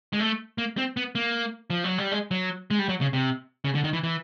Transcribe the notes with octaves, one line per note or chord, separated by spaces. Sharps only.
G#3
A3
A#3
C4
B3
A#3
F3
F#3
G3
G#3
F#3
G#3
G3
F#3
C#3
C3
C#3
D3
D#3
E3
E3